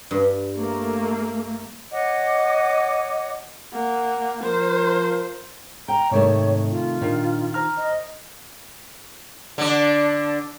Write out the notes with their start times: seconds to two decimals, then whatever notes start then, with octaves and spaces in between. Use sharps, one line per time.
0.11 G2
0.56 A3 A#3
1.92 C#5 D#5 F#5 D6
3.73 A#3 F#5
4.44 F3 A#4 C5
5.88 G5 A#5
6.11 G#2 C3 D#3 A3 C#5
6.71 F4
7.01 A#2 D#3 D4 D#4
7.54 C5 A#5 F6
7.78 D#5
9.58 D3 D4